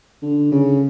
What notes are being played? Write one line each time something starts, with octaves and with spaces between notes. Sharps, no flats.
D3
C#3